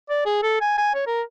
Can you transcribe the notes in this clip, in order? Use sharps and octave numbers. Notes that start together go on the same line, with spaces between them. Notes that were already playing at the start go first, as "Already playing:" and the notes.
D5
G#4
A4
G#5
G#5
C#5
A#4